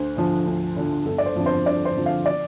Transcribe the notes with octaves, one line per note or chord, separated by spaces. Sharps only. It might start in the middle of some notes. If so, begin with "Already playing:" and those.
Already playing: D2 C5
D3 F3
D2
D3 F3
G1 A4
D5
C5
F2 D3 F3
C5
G1 D5
C5
F2 D3 F3
F5
D5